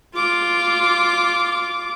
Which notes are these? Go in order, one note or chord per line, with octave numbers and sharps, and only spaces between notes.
F4 D6